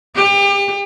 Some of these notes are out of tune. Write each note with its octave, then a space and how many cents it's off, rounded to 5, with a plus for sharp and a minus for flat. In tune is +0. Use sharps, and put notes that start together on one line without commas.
G4 +35